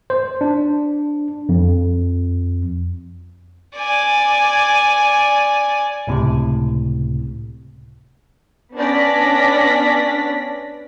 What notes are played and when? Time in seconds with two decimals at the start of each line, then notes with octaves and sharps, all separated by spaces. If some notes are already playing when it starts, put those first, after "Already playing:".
0.10 C5
0.41 D4
1.49 F2
3.77 D5 G#5
6.07 C#2 A2 C3
8.76 B3 C#4 D4 D5 A#6 B6